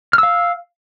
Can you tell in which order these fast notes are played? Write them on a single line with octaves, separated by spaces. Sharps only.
F6 E6 F5